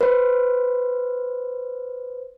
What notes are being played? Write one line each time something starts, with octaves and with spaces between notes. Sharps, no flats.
B4 C5